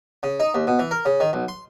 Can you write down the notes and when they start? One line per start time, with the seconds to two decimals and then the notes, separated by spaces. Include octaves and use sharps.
0.23 C#3
0.40 D#4
0.54 D#2
0.67 B2
0.79 E3
0.91 A#4
1.05 C#3
1.20 D#3
1.33 B1
1.48 C6